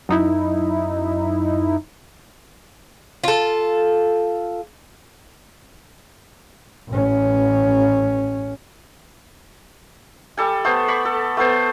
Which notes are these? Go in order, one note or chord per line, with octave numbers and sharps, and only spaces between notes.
F#2 D#4 E4
F4 A4
A1 C#4
G3 A4 G#5
A3 B3 C5
D5 B5 C#6
A4
A3 B3 C5